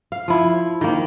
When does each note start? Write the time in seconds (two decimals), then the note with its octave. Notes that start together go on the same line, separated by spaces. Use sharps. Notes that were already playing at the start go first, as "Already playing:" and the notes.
0.12 F5
0.28 F3 E4
0.81 D#3 A#3